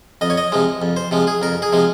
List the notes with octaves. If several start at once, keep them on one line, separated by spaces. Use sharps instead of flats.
F2 D#5
C#5
D#5
C3 F3 G#3
F2
C5
C3 F3 G#3
G#4
F2 A#4
G#4
C3 F3 G#3